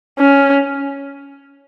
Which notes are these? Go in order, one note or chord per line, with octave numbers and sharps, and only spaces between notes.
C#4